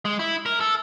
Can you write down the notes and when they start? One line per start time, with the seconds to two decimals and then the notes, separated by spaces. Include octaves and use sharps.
0.05 G#3
0.19 E4
0.46 A#4
0.60 A4